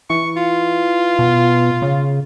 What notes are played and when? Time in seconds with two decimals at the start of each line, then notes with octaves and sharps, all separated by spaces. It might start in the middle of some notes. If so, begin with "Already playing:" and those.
0.10 E3 C#6
0.37 F4
1.19 B2
1.82 C#3